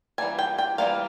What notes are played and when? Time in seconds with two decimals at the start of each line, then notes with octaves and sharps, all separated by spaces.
0.18 E3 G3 A#3 G#5
0.39 G5
0.58 G5
0.78 E3 G3 A#3 F5